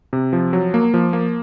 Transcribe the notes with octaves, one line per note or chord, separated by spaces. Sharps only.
C3
F3
F#3
A#3
F3
A#3